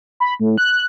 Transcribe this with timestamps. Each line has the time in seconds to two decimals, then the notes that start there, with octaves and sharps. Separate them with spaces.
0.20 B5
0.40 A2
0.58 F#6